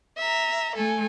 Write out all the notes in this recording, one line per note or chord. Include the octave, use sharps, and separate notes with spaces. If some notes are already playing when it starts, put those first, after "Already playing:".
E5 A#5
A3 A4 G#5